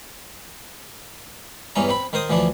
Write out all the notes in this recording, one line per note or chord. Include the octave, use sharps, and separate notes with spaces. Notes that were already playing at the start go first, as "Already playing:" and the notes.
E2 G2 E3 C#4 A#5
C4 B5
D#3 A#4 C5 D#6
D2 E3 F3 D4